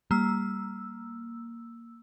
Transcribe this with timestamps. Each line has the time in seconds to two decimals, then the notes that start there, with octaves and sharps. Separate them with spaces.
0.11 G3 A#3 E6